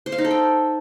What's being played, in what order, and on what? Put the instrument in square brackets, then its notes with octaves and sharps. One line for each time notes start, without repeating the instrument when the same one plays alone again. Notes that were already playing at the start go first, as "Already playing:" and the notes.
[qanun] C5
F5
D#4
A4
G5